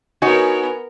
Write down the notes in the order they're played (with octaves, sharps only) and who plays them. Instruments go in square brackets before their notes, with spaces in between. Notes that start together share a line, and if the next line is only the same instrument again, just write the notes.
[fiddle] B3 A#4 [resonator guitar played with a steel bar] D#4 C#5 [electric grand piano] F#4 G#5